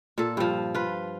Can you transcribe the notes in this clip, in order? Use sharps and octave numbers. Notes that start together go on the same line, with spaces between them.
A#2 A4
G2 F3
F4 B4